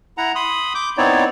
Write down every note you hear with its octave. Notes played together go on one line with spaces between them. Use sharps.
E4 F#5 A#5
B5 C6 D#6
D6 G6
B3 C4 D#4 E4 C#5 D5